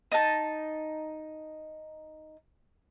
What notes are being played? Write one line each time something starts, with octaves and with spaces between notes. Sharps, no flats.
D#4 A5